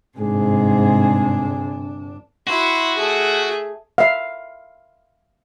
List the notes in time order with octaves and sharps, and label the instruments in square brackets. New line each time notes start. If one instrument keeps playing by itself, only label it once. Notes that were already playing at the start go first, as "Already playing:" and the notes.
[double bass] G1 D4 [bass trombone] G#2 [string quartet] C3 G#4
[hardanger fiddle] E4 C6 [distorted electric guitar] F#4
[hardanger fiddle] A3 G#4
[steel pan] E5 F5